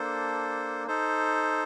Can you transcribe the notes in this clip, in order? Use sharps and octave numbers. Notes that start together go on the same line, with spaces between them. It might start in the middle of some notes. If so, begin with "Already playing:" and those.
Already playing: A#3 D4 A4 C5
D#4 A4 C5